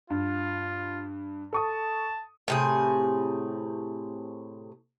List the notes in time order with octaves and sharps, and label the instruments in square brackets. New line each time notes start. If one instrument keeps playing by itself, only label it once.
[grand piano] G2 [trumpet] F4
[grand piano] A4 C#6 D#6 [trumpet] A5
[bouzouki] A2 C3 G#4